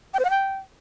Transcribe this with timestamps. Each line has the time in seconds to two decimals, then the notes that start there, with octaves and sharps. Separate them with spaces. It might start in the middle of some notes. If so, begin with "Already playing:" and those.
0.14 G5
0.19 C5
0.25 F#5
0.30 G5